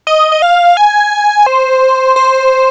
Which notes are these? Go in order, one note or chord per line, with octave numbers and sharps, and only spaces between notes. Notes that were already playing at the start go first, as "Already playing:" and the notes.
D#5
D#5
F5
G#5
C5
C5